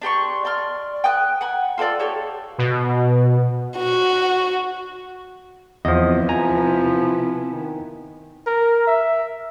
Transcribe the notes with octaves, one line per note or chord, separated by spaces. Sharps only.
D4 G4 C6 C#6
D5 C6 F6
G5 G#5 D#6 F#6
F#5 G#5 B5
F4 A4 C#5 D5
G4 A4 C#5
B2
F#4
E2 C3 F3 B3 E4 D#5
F3 G#5 A#5
D#3
A#4
E5